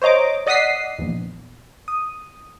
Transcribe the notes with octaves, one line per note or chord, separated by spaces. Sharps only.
C5 C#5 D#5 A#5 D6
D5 D#5 F#5 D#6 B6 C7
A#1 E2
D#6